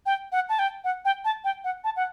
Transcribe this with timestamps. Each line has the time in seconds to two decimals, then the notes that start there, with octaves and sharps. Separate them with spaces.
0.06 G5
0.32 F#5
0.49 A5
0.59 G5
0.84 F#5
1.05 G5
1.25 A5
1.44 G5
1.64 F#5
1.84 A5
1.96 F#5